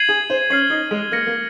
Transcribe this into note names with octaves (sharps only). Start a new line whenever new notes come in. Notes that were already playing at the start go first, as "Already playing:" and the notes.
Already playing: G#6 C7 D#7 F#7
G#4
C5
C#4 F6 C7 F#7
D#4
G#3
A#3 F6 A#6 C#7
A#3